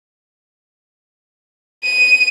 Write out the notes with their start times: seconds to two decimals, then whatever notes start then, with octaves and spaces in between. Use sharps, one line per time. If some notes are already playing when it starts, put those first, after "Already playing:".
1.84 D#7